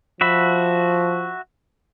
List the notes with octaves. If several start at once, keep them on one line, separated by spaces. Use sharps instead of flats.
F3 F#4 E5 B5